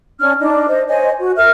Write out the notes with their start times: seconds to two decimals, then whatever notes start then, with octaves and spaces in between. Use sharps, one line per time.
0.19 C#4 D4 F6
0.39 D4 D#4 D#5
0.67 C5 D#5
0.88 C5 C#5 D#5 G#5
1.18 F#4
1.37 A#4 E5 F6